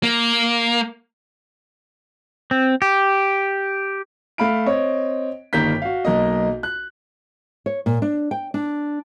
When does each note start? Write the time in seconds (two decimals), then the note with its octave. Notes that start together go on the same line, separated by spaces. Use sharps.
0.03 A#3
2.51 C4
2.82 G4
4.38 A3 F5 B5 F6 D7
4.66 C4 C#5 D#5
5.53 G1 D#3 G3 A#3 G6 B6
5.82 F#4 F5
6.05 B1 A#3 D#5
6.63 F#6
7.66 C#5
7.86 A#2
8.02 D4
8.31 G5
8.54 D4